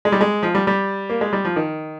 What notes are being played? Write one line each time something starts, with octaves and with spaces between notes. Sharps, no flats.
G#3
G3
G#3
F3
G3
G3
A#3
G#3
G3
F3
D#3